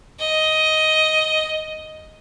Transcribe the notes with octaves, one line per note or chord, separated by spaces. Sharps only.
D#5